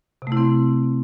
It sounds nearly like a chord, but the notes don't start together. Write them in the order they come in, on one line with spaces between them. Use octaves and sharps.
C3 A3 E4 C4